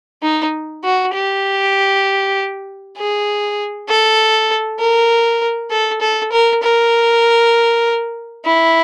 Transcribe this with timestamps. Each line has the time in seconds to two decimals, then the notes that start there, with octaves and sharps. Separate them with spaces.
0.23 D#4
0.84 F#4
1.14 G4
2.97 G#4
3.89 A4
4.80 A#4
5.71 A4
6.01 A4
6.32 A#4
6.63 A#4
8.45 E4